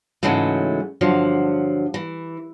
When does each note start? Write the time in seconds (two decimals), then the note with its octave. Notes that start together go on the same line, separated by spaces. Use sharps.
0.23 G#2 C#3 E3 F#3 G#3 A3
1.01 G2 D3 F3 F#3
1.94 E3